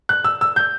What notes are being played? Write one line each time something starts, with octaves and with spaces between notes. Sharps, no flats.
F#6
E6
E6
G6